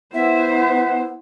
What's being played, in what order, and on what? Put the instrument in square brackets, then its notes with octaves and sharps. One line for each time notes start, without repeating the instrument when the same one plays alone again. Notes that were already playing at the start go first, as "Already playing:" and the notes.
[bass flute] B3 [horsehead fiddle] E4 C5 [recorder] E5 [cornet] F#5